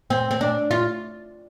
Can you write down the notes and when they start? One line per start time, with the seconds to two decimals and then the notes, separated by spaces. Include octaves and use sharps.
0.10 C4
0.31 C4
0.41 D4
0.71 F4